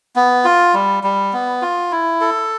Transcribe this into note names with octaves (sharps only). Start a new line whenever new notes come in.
B3
F4
G3
G3
B3
F4
E4
A4